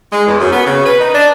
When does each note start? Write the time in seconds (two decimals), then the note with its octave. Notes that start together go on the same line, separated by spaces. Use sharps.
0.12 G#3
0.27 E2
0.40 F#2
0.53 B3
0.66 C#3
0.85 B4
1.00 D#4
1.14 D4